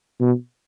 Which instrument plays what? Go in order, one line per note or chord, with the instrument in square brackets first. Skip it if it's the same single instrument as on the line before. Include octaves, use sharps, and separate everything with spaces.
[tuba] B2